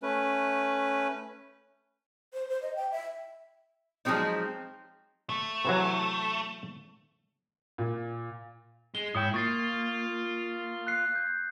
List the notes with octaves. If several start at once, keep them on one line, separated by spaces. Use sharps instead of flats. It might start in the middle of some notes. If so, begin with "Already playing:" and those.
A3 C#4 B4
C5
C5
D#5
G5
E5
F3 F#3 G#3 C4 D#4
A3
C3 E3 F#3
A#2
G#3 G7
G#2 E4 C#5 G5 D#6
A#3 F4 C#6 A6 C7
F#6 C7
G6